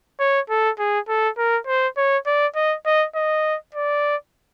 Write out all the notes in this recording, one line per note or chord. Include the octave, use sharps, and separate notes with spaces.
C#5
A4
G#4
A4
A#4
C5
C#5
D5
D#5
D#5
D#5
D5